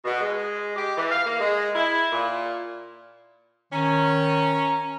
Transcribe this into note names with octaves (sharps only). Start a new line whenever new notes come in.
B2
G#3
G4
E3
F5
A#3
G#3
E4
A#2
D#3 C#4 A#5